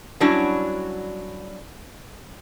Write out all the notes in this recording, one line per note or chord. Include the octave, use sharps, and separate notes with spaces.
F#3 G3 C#4 D4 E4 F#4